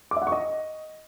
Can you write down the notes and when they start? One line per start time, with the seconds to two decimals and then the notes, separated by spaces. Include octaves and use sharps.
0.11 D6
0.16 E5
0.22 F#5
0.27 C#6
0.32 D#5